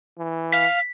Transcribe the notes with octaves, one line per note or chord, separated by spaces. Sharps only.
E3
F5 B6